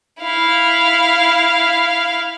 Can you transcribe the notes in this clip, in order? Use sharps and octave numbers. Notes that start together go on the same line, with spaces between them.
E4 F5